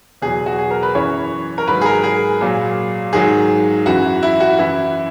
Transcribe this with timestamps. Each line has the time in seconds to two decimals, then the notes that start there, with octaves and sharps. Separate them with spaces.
0.22 E2 B2 F#3 G#4
0.46 F#4
0.59 G#4
0.71 A#4
0.83 B4
0.95 F#2 E3 C#5
1.58 A#4
1.67 G#2 D#3 F#3 B4
1.81 G#4
1.86 A#4
2.03 G#4
2.41 A#2 F#3
3.13 G#2 D#3 F#3 G#4
3.86 F#2 E3 F#4
4.23 E4
4.40 F#4
4.58 F#2 E3 E4